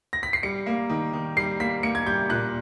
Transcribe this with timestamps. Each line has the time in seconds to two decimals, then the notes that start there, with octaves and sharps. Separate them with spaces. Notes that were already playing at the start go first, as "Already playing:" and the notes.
0.13 A#6
0.23 B6
0.33 C7
0.43 G3 C#7
0.66 A#3
0.90 D#3
1.13 D#3
1.37 G3 C7
1.60 A#3 B6
1.83 A#3 C#7
1.95 G#6
2.06 G3 G6
2.30 A#2 F#6